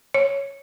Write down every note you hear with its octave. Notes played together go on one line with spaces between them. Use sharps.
C#5